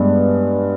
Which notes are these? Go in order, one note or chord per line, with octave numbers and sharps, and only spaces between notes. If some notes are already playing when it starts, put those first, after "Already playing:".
Already playing: G2 G#3 B3 D4